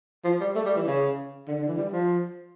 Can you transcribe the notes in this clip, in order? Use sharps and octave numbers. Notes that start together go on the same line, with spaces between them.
F3
G3
A3
G3
E3
C#3
D3
D3
E3
G3
F3